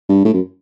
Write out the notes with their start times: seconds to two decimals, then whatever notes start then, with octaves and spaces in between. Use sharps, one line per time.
0.09 G2
0.25 A2
0.33 F#2